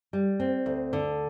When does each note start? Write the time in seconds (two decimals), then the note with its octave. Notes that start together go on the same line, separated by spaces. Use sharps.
0.13 G3
0.40 C4
0.66 D2
0.93 D3